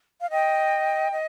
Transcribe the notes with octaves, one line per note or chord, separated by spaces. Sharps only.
F5
D#5 G5
D#5